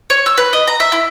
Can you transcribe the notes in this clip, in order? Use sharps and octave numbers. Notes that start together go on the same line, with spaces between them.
C#5
E6
B4
D#5
A#5
E5
E4